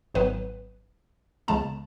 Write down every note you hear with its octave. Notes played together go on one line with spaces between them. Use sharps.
G#1 G#2 F#3 B3 B4
C#2 C#3 G#3 B3 A5